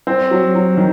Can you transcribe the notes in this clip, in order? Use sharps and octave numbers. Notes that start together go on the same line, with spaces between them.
C4
F#3
F#3
D#3